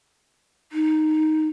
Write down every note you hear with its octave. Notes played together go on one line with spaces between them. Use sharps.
D#4